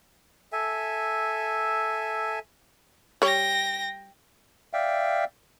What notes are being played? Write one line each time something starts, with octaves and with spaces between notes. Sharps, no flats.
A4 E5 G#5
G3 C#5 G5 A#6
D5 E5 F5 G5